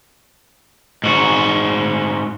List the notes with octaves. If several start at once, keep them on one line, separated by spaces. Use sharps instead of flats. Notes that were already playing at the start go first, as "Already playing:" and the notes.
G#2 F#4